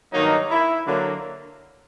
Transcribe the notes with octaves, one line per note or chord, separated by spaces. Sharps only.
G2 D#3 F#3 A#3 D#4
E4
D3 F#3 A#3